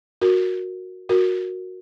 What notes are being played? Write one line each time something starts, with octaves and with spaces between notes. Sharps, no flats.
F#4 A#4
F#4 A#4